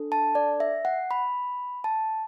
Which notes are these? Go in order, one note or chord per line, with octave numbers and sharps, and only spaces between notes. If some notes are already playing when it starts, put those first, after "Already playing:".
Already playing: D4 A4
A5
D5
E5
F#5
B5
A5